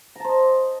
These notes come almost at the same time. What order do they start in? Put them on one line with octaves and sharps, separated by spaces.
A#5 A5 C5 D#5